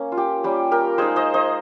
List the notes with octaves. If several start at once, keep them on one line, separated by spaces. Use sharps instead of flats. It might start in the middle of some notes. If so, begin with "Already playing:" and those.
Already playing: A#3 C#4
F4
G4
G3 A#3 C#4 G4
G4 A#4
G#3 D#4 G#4 C5
C5 D#5
C5 D#5